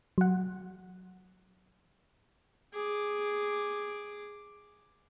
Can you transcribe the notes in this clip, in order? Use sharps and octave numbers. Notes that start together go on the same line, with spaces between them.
F#3 F#5
G#4 D6